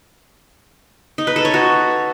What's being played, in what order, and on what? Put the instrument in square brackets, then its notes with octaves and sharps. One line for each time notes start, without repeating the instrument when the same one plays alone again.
[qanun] D#4
B4
A4
C#5
F#4